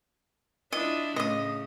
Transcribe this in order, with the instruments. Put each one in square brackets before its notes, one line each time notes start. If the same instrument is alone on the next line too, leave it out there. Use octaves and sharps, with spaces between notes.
[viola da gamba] D4 E4 F4 [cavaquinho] D#5
[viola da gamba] A2 C#3 [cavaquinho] D#5 D#6